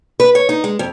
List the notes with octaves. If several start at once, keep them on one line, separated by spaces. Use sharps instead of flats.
B4
C#5
D#4
G#3
F2